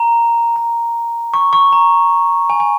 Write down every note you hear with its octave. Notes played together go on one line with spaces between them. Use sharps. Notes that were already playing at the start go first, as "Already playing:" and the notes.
Already playing: A#5
A#5
C#6
C#6
A#5
G#5
G#5